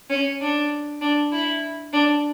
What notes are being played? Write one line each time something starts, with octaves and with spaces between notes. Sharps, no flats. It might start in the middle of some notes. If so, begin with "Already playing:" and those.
C#4
D4
D4
E4
D4